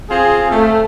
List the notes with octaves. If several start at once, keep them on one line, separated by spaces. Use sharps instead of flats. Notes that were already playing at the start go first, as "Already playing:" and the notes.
C4 F4 G#4
A3